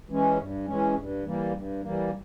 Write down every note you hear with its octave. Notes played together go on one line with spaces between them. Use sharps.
E3 G#3 C#4
G2
E3 G#3 C#4
G2
E3 G3 A#3
G2
E3 G3 A#3